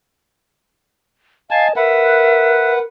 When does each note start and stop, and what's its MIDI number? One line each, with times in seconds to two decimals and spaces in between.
1.51 1.73 75
1.51 1.67 77
1.51 1.68 80
1.51 1.68 81
1.76 2.84 70
1.76 2.79 71
1.76 2.73 76
1.76 2.79 78